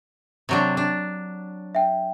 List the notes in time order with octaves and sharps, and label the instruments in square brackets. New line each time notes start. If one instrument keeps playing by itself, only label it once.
[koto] C3 F#3 D4
D4
[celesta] E5 G5